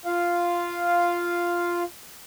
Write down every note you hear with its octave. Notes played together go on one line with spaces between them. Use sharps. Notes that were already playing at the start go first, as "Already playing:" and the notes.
F4 F5